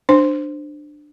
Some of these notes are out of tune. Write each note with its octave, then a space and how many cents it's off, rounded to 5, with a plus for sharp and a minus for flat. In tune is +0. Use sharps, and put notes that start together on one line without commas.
D4 +15 C5 -5